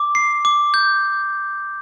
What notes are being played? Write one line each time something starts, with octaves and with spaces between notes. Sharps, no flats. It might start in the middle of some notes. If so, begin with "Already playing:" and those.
Already playing: D6
C7
D6
G6